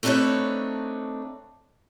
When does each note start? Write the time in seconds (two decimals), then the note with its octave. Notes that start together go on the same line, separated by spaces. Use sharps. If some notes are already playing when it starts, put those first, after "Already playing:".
0.03 A3 C4 D4 D#4 B4 C#5